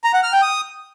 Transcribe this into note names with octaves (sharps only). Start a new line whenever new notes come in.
A#5
F#5
F6
G5
D#6